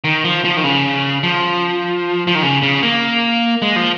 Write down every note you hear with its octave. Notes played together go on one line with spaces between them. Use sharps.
D#3
F3
F3
D#3
C#3
F3
F3
D#3
C#3
C#3
A#3
G#3
F3